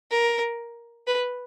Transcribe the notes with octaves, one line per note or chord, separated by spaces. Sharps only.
A#4
B4